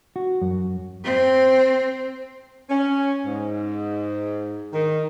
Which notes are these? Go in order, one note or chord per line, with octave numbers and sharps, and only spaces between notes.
F#4
F#2
C4
C#4
G#2
D#3